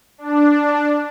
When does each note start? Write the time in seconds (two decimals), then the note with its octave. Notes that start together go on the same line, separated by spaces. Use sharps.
0.18 D4